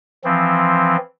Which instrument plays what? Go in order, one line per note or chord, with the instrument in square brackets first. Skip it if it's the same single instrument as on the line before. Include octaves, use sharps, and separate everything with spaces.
[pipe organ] E3 F3 C4